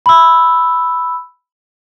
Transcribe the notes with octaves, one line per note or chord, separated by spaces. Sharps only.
B5 E6